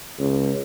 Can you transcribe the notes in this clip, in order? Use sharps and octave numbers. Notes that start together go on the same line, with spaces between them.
C#2